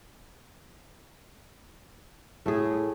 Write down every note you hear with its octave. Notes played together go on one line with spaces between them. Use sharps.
A2 A3 G#4